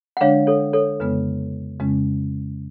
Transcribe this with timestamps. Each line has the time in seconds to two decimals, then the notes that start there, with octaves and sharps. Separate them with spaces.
0.17 F#5
0.21 D3 G#3 D4 C#5 F5
0.47 A4 C#5
0.73 A4 C#5
1.00 F2 C#3 G#3 B3 B4
1.80 F2 C#3 G#3 C#4